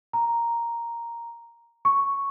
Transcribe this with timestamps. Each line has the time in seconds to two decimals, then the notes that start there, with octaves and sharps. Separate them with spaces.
0.13 A#5
1.85 C#6